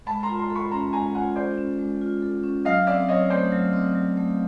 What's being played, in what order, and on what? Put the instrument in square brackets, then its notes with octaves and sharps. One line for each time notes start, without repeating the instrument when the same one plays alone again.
[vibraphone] G#3 [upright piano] A5 B5
[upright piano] A#5 C6
[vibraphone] F4
[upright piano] A#5 C6
[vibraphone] A4
[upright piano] B5 C#6
[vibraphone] C#4 [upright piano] A#5 C6
[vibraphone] G#3 [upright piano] G#5 A#5
[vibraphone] F4 [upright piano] F#5 G#5
[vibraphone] A4 [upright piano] C5 D5
[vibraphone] C#4
G#3
F4
A4
C#4
[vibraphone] F#3 [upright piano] D#5 F5
[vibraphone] C4 [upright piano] D5 E5
[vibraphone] F#3 [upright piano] C#5 D#5
[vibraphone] A3 [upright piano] C5 D5
[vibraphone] F#3
C4
F#3
A3